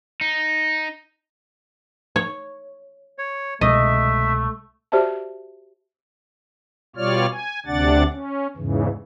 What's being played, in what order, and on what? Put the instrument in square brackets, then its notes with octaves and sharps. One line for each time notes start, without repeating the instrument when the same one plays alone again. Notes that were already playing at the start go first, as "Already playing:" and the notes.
[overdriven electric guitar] D#4
[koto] C#5
[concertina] C#5
[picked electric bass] C2 B2 G#3 [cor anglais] A3 [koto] D#5 [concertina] E5
[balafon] F#4 G4 C5 D5 E5 A5
[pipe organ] B2 G3 F4 C#5 D5 F6
G#5
D2 C3 D4 D5 F#5 A6
C#4
E2 G#2 C#3 E3